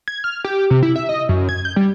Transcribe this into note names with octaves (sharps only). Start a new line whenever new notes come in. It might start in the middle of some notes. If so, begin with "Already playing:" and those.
G#6
F6
G4
C3
E4
E5
D#5
F#2
G#6
G6
G3